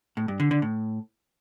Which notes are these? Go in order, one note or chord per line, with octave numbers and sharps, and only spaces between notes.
A2
G2
D3
D3
A2